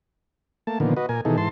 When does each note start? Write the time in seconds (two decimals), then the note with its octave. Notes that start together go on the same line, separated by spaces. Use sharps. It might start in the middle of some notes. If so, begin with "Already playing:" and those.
0.67 A3 A#3 A5
0.80 A#2 D3 D#3 F3 A#3 B3
0.97 F#4 B4 D#5
1.09 A#2 A#4 G#5
1.25 B2 D#3 E3 D#4 G#4 A4
1.38 G#2 E3 A5 C6